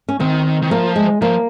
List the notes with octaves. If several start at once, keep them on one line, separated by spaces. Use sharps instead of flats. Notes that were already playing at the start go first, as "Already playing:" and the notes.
C#4
D#3 C4
D#3
F3 A#3
G#3
F3 A#3